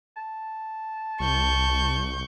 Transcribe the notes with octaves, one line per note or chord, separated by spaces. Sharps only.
A5
C2 C#6 G6